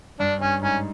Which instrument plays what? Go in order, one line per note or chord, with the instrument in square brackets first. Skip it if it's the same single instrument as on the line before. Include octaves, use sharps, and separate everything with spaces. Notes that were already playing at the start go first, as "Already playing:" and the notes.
[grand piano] G2 [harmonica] D4
[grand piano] G2 [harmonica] C#4
[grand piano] G#2 [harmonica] C#4